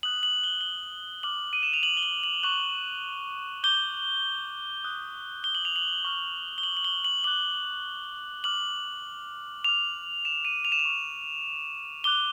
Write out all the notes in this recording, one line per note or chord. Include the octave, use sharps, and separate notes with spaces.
D#6 F#6 F#7
F#7
G7
G7
D6 F6 F#7
D#7
E7
F7
F#7
G7
F#7
F#7
C#6 F#6 F#7
D6 G6 G7
D#6 F#6
G7
F#7
F7
F#7
C#6 F6
G7
F#7
F#7
G7
F#7
D6 F#6 F#7
D6 F6 F#7
D6 F6 F7
E7
D#7
F7
E7
F7
C#6 F6
D6 F#6 G7